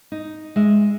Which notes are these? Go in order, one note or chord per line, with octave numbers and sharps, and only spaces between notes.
D#4
G#3 E5